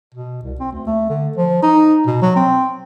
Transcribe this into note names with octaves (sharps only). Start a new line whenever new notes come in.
B2
C2
C4
D2
A3
D3
F3
D#4
B2
F#3
C4